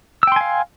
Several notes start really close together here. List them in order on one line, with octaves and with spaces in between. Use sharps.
E6 G5 C6 G#5 F5